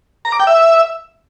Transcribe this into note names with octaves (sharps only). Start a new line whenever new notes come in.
A#5
D6
G5
E5